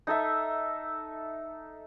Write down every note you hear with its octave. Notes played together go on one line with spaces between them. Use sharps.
D#4 A4 E5